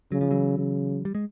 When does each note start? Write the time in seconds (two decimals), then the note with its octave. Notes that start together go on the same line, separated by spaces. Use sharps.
0.12 C#3 F#3
0.21 F3
0.30 E3 F#3
0.58 C#3
1.05 G3
1.15 G#3